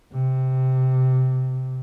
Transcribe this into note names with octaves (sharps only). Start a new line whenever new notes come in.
C3